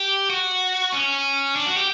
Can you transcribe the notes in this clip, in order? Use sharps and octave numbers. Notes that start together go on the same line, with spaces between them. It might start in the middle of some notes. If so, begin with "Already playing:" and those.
Already playing: G4
F#4
C#4
D4
F#4
G4